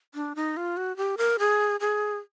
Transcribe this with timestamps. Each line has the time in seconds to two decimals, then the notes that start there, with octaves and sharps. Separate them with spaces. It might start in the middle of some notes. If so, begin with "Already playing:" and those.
0.14 D4
0.36 D#4
0.57 F4
0.77 F#4
0.97 G4
1.18 A#4
1.39 G#4
1.80 G#4